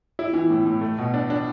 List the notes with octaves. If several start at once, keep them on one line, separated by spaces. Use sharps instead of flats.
E4
E3
A2
A2
A3
B2
D4
D4